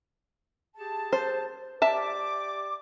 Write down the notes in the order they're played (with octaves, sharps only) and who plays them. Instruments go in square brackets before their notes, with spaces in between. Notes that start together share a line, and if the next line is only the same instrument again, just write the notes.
[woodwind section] G4 G#4 A5
[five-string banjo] C5
[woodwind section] G4 D5 D6 [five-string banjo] E5 A5